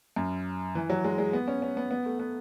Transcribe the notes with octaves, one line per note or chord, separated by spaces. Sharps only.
F#2
E3
F#3
G#3
G#3
B3
C#4
C#4
B3
B3
A3
B3